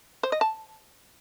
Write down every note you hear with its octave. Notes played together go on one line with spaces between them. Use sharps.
C5
D#5
A5